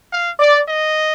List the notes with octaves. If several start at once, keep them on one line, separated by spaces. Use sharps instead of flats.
F5
D5
D#5